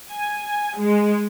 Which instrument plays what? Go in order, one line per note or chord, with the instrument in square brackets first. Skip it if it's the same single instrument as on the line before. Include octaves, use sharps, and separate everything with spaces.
[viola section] G#5
G#3